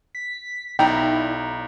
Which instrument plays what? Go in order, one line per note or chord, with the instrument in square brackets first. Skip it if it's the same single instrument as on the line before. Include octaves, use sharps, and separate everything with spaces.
[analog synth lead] B6
[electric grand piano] B1 A#5 [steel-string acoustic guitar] D#4 D5 D#5 [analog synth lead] E4 [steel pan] G5